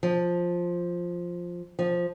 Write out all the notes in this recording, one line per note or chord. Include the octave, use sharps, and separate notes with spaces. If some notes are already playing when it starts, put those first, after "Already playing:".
F3
F3